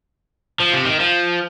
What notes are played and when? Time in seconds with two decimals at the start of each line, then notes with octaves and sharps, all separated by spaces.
0.60 F3
0.73 C3
0.85 D#3
1.00 F3